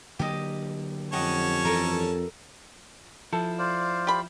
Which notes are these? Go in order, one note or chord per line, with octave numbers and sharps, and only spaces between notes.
D3 F#3 A#3 G4 D#5
F2 C#4 G4 C#5 D#5 F#5 A5
G2 E3 A4 A#4
F3 E4 A4
C5 D5 F5
G4 B5